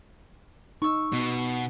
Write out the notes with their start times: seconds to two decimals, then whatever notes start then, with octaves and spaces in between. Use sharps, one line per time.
0.82 D#4 C#6 E6
1.13 B2